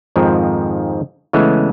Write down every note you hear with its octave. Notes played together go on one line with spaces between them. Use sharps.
F2 G#2 D#3 F3 C4
C#3 E3 G#3 A3 B3